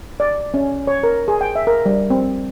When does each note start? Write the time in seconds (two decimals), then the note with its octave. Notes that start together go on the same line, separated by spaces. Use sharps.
0.20 D5
0.54 C#4
0.87 C#5
1.03 A#4
1.28 G#4
1.41 G5
1.56 E5
1.67 A#4
1.86 G3
2.10 C4